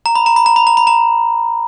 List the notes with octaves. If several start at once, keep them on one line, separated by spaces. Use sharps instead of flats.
A#5
B5
A#5
B5
A#5
B5
A#5
B5
A#5